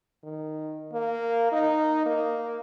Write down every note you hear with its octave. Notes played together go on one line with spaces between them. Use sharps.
D#3
A#3
D#4
A#3